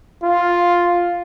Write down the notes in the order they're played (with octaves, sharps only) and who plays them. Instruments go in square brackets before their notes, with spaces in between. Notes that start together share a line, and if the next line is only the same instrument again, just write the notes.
[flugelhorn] F4